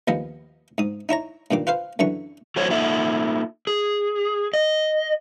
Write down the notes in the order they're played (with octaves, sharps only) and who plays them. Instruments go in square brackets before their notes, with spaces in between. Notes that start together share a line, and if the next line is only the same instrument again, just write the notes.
[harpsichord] D#2 F3 B3 D#5
G#2 D#6
D#4 E4 C#5 A#5
G2 A#2 D#3 D6
F4 B4 C5 F5
F#2 D3 E3 C#6
[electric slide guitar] F#3 A3 F4 C5 C#5
A#3 D#4 F4 A4 E5
G#4
D#5